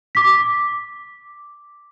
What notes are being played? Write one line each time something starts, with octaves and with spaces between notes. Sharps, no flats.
D6 B6